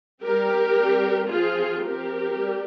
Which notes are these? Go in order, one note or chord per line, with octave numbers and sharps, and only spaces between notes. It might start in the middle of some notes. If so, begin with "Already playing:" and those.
G3 C4 G4 A#4
G3 C4
F3 C4 F4 G#4
F3 C4 G4 A#4
G3